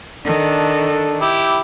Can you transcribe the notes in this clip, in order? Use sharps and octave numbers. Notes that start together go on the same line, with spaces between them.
D#3 D4 A4
E4 G4